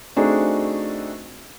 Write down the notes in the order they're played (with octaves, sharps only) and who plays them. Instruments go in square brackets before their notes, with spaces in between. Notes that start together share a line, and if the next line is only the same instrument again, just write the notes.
[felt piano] A3 C4 D4 D#4 F#4 G#4